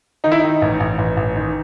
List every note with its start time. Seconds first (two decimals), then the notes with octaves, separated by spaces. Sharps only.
0.24 D#3 D#4
0.32 E4
0.40 D#3 D#4
0.62 A1
0.80 A1
0.98 A1
1.17 A1
1.36 D#3